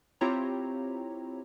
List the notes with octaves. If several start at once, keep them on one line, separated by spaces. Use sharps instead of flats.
C4 E4 F4 G4 C#5 A#5